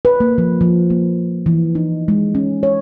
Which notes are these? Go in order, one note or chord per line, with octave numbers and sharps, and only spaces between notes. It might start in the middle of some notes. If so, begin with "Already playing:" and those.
B4
A#3
F3
F3
A#3
E3
D#4
G#3
C#4
C#5